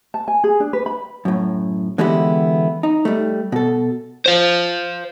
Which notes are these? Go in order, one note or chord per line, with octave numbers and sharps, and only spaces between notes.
A5
G#5
G#4
D4
B4
B5
F#2 A2
D3 E3 G#3 B3 E4 G4
D#4
G3 A3
B2 A4
C5 F5